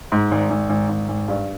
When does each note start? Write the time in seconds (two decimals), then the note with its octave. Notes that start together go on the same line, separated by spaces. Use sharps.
0.12 G#2
0.31 G#1
0.50 G#1
0.69 G#1
0.89 G#1
1.08 G#1
1.28 G2